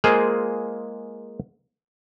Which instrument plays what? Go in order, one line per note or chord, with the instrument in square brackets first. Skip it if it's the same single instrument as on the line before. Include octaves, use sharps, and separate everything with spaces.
[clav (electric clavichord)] G#3 A#3 F4 G#4 C5